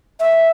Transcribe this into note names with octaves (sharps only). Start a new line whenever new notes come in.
E5